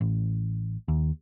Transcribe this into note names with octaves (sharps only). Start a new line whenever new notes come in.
A1
D#2